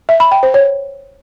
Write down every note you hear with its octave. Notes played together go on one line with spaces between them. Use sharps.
E5
B5
G5
C5
C#5